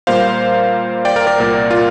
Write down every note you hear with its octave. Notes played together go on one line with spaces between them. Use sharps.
A#2 G3 A#3 C5 F5
D5 G5
A#4 D5
A#4 D5
C2 A#2 A#3
F4 A#4